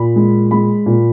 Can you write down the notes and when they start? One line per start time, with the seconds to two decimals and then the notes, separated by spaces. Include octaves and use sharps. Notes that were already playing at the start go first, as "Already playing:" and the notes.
Already playing: A#2 B5
0.16 G#3
0.51 G#3 B5
0.86 A#2